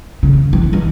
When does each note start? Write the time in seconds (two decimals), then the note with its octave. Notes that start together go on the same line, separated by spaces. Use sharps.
0.23 C#3
0.53 E3
0.73 E3